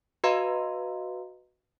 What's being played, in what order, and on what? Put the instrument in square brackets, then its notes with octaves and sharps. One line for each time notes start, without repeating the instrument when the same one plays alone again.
[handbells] F#4 B4 D#5 F5 A#5 C6